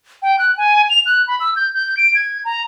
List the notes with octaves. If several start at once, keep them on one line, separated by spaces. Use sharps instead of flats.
G5
F#6
G#5
F7
F#6
B5
E6
G6
G6
D7
G#6
A#5